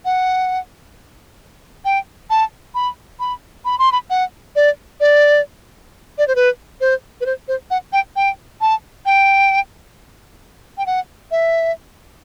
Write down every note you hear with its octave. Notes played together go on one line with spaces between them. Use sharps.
F#5
G5
A5
B5
B5
B5
C6
B5
F#5
D5
D5
D5
C5
B4
C5
B4
C5
C5
F#5
G5
G5
A5
G5
G5
F#5
E5